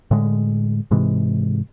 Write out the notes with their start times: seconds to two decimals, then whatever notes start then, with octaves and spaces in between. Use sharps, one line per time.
0.11 A2 D3 G#3
0.91 G#2 C3 E3 G#3